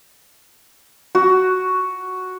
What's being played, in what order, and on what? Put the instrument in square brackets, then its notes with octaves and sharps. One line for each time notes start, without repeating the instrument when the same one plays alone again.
[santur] F#4